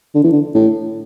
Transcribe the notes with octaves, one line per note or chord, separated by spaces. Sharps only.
D3
E3
D3
A2